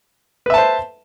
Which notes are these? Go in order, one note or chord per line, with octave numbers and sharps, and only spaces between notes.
B4 C5 E5 A5